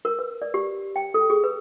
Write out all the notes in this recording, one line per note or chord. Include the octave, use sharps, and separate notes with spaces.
A#4
B4
D5
G4
G5
A4
G#4
B4